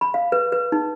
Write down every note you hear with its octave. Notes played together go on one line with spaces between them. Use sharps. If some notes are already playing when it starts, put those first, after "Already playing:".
B5
F5
B4
B4
D#4